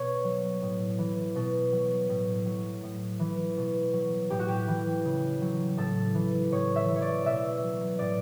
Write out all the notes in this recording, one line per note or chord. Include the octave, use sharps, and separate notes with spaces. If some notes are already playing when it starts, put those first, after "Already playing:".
Already playing: B2 C#5
F#3
A2
E3
B2
F#3
A2
F#3
A2
E3
B2
F#3
A2 G4
F#4
G4
E3
C#3
F#3
A2 A4
E3
A2 C#5
E5
E3
C#5
D5
B2 E5
F#3
A2 D5